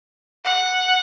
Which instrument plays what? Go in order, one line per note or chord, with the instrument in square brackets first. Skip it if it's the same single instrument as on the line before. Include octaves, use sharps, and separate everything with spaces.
[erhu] F#5